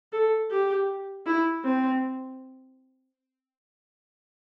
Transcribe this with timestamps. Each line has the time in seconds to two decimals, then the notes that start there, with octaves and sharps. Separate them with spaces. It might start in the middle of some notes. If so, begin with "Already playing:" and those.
0.12 A4
0.51 G4
1.26 E4
1.64 C4